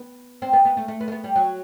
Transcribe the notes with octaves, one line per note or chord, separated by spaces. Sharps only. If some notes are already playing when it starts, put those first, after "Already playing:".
Already playing: B3
C4
B3
B3
A3
A3
B3
A3
B3
G3
F#3